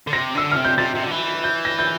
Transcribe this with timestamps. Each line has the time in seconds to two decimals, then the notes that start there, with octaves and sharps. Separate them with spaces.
0.07 D3
0.13 C3 A#6
0.35 D3 E6
0.51 C3 F6
0.65 G6
0.78 C3 A6
0.95 C3
1.03 D3
1.11 E3
1.44 G6
1.65 A#6
1.79 G6